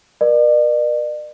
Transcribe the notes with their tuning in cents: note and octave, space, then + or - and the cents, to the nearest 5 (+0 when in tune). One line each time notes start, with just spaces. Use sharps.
A#4 +40 D5 +40